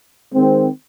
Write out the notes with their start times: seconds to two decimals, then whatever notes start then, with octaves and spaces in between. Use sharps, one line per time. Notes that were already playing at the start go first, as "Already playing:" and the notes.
0.33 D#3 G#3 C4